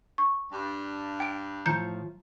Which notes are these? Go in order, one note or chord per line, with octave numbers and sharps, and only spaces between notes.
C#6
G2
G5 D7
A2 F3 A#5 G6 C#7